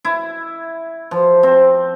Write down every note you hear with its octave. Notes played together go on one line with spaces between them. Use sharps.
E4
F3
C4